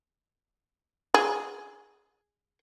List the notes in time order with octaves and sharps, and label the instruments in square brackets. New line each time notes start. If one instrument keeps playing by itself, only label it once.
[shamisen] G#4